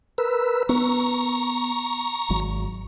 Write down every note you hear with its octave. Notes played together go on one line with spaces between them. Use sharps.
A#4 B4 E6
B3 A#5 C#6
G#1 F#3